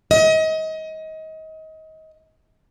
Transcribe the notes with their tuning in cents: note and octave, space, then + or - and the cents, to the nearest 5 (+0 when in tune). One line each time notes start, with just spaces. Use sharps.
D#5 +30